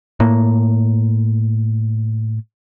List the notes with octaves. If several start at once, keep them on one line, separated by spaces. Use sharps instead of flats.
A2 A#3